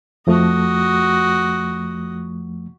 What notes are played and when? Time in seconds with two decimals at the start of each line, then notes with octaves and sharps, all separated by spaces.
0.27 F2 F3 A3 F#4 D#5